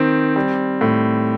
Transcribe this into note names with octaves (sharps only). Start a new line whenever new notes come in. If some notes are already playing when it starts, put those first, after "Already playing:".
Already playing: D#3 C4
G3
A2